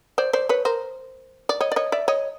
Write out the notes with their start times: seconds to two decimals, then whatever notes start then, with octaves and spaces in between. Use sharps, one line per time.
0.18 C5 D5
0.33 C5 D5
0.49 B4 C#5
0.65 A#4 C5
1.49 D5
1.60 C#5 D#5
1.72 D5
1.76 C#5 D#5
1.92 D5 E5
2.08 C#5 D#5